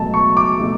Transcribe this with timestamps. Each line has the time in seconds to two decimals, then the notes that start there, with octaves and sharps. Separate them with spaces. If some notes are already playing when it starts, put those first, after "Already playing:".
Already playing: C#2 B2 F#3 A3 A5
0.14 C#6
0.37 D6
0.59 B2 F#3 A3